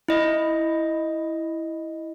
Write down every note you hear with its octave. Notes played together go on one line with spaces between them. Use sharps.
E4 D#5